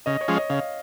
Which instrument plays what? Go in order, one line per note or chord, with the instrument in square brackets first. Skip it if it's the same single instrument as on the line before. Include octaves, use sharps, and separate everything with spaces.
[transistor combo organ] C#3 [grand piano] D#5
[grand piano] C#5
[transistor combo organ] F3 G#3 C#4
[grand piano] D#5
[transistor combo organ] C#3 [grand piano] F5